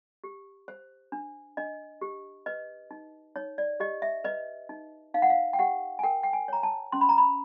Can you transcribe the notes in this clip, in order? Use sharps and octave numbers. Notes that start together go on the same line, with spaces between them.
G4
C5
D4
D4 D#5
G4
B4 D#5
D#4
D#4 C#5
D5
G4 D#5
E5
B4 D#5
D#4
D#4 F5
F#5
F5
G5
G4 F#5
G#5
A#4 G5
G5
G#5
C#5 A#5
A5
C#4 C6
B5
A#5
B5